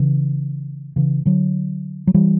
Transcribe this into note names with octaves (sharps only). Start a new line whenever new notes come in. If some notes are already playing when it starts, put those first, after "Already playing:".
Already playing: C#3 E3
C#3 E3
D3 F#3
F#3
E3 G3